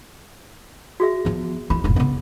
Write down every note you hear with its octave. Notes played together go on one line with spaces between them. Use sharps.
F#4 G#4 E5
F3 B3
F2 E3 B5
F1 A2
C#3 B3